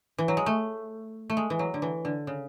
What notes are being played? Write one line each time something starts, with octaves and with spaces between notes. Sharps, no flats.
E3
F#3
G#3
A3
A3
G#3
E3
F#3
D3
E3
D3
C#3